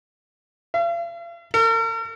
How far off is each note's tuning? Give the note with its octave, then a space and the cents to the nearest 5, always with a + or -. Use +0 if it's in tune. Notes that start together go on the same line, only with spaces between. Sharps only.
F5 -45
A#4 -45